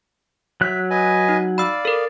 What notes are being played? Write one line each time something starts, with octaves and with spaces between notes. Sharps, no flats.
F#3 E5 F#6
B4 D#5 G#5
D#4
D5 F5 B5 E6
A4 A#4